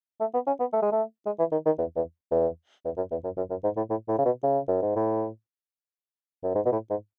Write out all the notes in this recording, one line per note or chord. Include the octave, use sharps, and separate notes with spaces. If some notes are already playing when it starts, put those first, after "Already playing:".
A3
B3
C#4
B3
A3
G#3
A3
G#3
E3
D#3
D#3
E2
E2
E2
E2
F#2
E2
F#2
F#2
F#2
G#2
A2
A2
A2
C#3
B2
C#3
F#2
G#2
A2
F#2
G#2
B2
A2
G#2